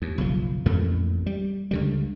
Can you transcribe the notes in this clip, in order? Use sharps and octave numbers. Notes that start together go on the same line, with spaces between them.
D#2
F#1 B1 F3
A1 F2 A#2 A3
G3
C#2 D3 G3